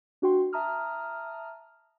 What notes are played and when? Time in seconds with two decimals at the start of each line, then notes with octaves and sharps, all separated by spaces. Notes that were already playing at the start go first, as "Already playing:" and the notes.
0.22 D4 F#4 G5 C6
0.53 E5 A5 A#5 D#6 F6